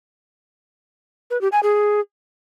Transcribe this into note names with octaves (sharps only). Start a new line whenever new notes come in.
B4
G4
G#5
G#4